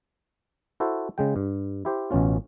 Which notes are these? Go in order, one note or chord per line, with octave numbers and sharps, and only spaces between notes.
E4 F#4 A4 C5
C#3 G#3 G5
G2
E4 G4 C5
A1 B2 C#4 F4